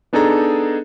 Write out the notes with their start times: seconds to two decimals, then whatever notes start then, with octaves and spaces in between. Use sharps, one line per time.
0.13 B3 D4 D#4 G#4 A4 A#5